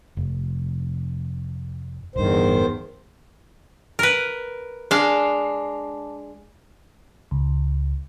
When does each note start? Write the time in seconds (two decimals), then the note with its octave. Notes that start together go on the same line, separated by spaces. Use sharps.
0.17 F1
2.16 D1 E2 G2 D#3 C5
3.99 A#4 B4
4.91 G#3 D4 F5
7.31 C#2